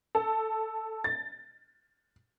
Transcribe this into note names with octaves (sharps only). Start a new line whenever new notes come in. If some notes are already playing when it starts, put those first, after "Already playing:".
A4
A6